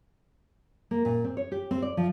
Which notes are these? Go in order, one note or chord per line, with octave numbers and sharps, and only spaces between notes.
A#3
A#2
C4
C#5
G4
C4
D5
F3